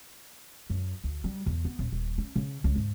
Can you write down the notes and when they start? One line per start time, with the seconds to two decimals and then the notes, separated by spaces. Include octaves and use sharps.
0.70 F#2
1.04 D2
1.24 G3
1.46 E2
1.65 B3
1.79 D#1
1.92 D#1
2.18 C#4
2.36 C#3
2.64 C#2
2.76 G#2